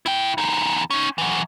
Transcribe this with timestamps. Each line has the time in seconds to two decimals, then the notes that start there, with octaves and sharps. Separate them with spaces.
0.06 E4 G5
0.38 E2 D#4
0.90 C#4 D#4
1.18 E3 F#3